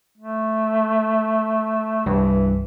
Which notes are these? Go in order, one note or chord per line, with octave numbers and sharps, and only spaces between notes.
A3
C2 G2 E3